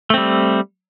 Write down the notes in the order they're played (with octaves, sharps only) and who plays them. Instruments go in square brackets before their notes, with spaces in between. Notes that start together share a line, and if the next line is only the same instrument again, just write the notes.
[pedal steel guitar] A3
C4
G3